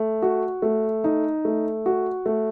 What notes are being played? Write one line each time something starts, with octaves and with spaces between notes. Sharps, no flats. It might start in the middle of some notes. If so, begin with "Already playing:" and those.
Already playing: A3
F#4
A3
D#4
A3
F#4
A3